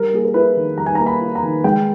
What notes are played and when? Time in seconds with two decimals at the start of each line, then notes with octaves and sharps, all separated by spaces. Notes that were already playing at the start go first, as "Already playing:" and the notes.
Already playing: G3 A#4
0.13 A#3 G#4
0.25 A#4
0.34 E4 B4
0.56 D#3
0.78 G3 A#5
0.86 G#5
0.95 A#5
0.99 A#3
1.06 B5
1.21 E4
1.35 A#5
1.43 D#3
1.64 G#3 G5